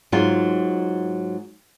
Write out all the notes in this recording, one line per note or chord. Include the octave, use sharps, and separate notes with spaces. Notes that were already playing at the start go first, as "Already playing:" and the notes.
G#2 F#3 G#3 F4